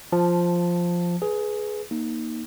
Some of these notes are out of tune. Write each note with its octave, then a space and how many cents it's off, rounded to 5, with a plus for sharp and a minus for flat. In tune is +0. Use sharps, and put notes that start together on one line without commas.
F3 +0 A5 +0
G#4 +15 B4 -5
A#3 +15 D#4 +0